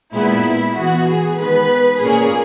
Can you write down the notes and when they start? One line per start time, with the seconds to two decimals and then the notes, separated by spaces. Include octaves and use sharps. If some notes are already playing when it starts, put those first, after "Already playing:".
0.14 A#2 G#3 B3 E4
0.76 E3 B3 F#4
1.08 G#4
1.39 D#3 G#3 B3 B4
2.01 A#2 A#3 C#4 G#4